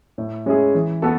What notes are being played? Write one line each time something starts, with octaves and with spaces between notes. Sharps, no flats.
A2
G#3 C#4 E4 G#4
E3
B3 F#4 A4